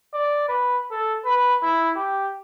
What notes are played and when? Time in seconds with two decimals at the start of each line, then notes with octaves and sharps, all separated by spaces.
0.14 D5
0.48 B4
0.91 A4
1.26 B4
1.63 E4
1.96 G4